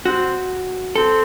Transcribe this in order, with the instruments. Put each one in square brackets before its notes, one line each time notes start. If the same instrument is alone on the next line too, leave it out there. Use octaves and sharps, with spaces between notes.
[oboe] C4 [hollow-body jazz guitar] F#4
[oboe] C4 [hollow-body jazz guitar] A4